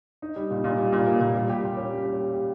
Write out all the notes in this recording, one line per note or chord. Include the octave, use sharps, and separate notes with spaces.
D#4
G3
A#2
A#2
G3
A#2
A#3
A#2
G3
G4
A#2
C#4
G3
G4
G4
G4